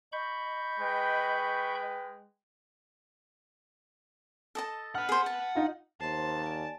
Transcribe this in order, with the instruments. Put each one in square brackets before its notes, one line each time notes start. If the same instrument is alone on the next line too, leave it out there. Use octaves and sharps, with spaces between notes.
[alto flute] D#5 [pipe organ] B5 C#6 G6
[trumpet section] G#3 B4 G5
[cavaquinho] A4 D#5 A5
[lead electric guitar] F#5 B5 [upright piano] F6
[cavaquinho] G#4 C5
A5
[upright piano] D#4 F4
[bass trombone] D#2 [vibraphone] C5 C6 [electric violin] A5
[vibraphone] D5 G#5